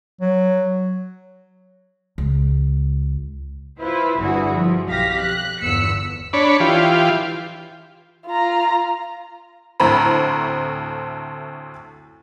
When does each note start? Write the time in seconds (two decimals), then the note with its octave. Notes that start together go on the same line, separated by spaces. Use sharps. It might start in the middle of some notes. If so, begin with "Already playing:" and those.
0.21 F#3
2.18 C#2
3.80 E4 F4 B4 C5
4.18 G1 E2 G2 E4 F#4 G#4
4.53 F3
4.87 B1 F2 G4 F5 A#6 B6
5.20 F#6
5.61 G1 E2 E6 B6 C#7
6.33 D4 C#5 B5
6.60 E3 F4 G4
8.26 F4 A#5
9.80 D2 A2 A3 C4 A#5 B5